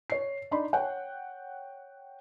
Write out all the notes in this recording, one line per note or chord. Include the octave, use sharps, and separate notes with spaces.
C#5 C7
D4 D#4 D5 B5 C6
C#5 F#5 G5